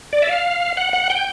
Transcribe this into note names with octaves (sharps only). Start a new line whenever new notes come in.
D5
E5
F5
F#5
F#5
G5